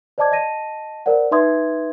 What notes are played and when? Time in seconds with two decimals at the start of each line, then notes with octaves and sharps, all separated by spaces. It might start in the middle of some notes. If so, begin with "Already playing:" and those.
0.18 C5 D5 D#5 A5 D6 G#6
0.32 D#5 A5 A#6 D#7
1.06 A#4 C5 D5 F#5
1.31 D#4 B4 E5 C6 D#6 G#6